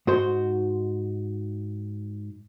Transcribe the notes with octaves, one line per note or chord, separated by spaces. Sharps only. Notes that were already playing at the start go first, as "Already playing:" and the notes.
G#2 F#4 C5